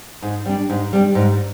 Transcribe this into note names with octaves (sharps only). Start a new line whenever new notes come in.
G#2
G3 D4
G#2
G3 D4
G#2